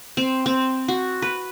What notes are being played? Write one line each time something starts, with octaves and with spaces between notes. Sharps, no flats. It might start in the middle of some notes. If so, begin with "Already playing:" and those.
C4
C4
F#4
B4